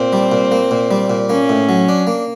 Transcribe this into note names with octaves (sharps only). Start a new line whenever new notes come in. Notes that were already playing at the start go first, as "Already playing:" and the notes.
Already playing: A#2 C4
G3
A#2
A#3
A#2
G3
A#2
A#3 C#4
A2
F#3
D4
A#3